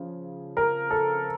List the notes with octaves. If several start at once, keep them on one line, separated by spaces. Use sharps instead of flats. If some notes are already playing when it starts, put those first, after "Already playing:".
Already playing: C#3 F3
A#4
A4